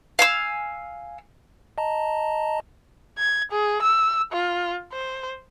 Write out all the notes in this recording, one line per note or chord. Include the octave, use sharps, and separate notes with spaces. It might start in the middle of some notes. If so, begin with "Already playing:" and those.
F5 G#5 E6
D#5 A5 A#5
G#6
G#4
E6
F4
C5